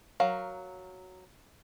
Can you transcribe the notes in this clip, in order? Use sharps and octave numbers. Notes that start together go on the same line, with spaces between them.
F#3 A#4 F5